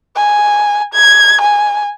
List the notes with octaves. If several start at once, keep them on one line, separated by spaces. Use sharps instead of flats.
G#5
G#6
G#5